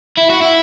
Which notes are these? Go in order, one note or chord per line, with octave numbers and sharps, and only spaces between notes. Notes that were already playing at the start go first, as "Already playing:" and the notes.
E4
F#4
E4